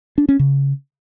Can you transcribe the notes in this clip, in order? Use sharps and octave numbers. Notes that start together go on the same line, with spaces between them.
D4
C#4
C#3